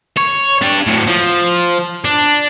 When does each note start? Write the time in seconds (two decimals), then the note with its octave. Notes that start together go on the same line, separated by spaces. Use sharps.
0.17 C#5
0.62 D4 G4
0.87 A2 F#3
1.07 F3
2.05 D4